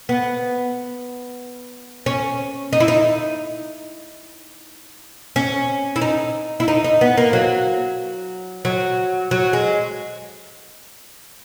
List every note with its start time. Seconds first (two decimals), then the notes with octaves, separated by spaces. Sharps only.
0.09 B3
2.06 C#4
2.73 D#4
2.80 E4
2.88 D#4
5.36 C#4
5.96 E4
6.02 D#4
6.60 E4
6.68 D#4
6.84 D#4
7.01 B3
7.18 A#3
7.33 F#3
8.65 F#3
9.31 F#3
9.53 G#3